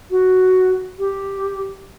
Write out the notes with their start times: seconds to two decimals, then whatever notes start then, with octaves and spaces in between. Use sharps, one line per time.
0.11 F#4
0.99 G4